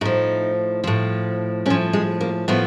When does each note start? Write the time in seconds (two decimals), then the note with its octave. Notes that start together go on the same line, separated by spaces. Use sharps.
0.01 A2 F3 D#4
0.84 A2 F3
1.66 A2 C#4
1.70 F3
1.93 G#3
2.21 A#3
2.48 A2 F3 B3